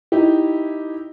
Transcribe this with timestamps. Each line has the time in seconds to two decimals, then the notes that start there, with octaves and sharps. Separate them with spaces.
0.12 D#4 E4 G4